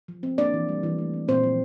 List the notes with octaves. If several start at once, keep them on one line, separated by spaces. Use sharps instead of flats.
F3
C4
A#3 D4 D5
E3
G3
E3
A3
C4
A#2 C4 C5
F3